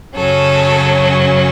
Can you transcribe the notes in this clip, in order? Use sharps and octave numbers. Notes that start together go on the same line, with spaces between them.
F#2 C#3 F#3 C#4 A4